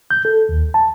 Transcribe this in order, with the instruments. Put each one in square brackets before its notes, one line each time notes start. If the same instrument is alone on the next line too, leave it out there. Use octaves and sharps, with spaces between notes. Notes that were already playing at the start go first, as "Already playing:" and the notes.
[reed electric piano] G6
A4
D#2
A5